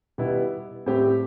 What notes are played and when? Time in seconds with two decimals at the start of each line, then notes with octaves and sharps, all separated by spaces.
0.18 B2 G3 B3 E4
0.86 A2 G3 C4 G4